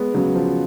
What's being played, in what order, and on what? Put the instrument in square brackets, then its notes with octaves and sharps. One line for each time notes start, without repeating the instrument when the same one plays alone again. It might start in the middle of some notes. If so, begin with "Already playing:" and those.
Already playing: [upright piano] G#3 [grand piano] B3
[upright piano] C#3 [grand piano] F#3
[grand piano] F3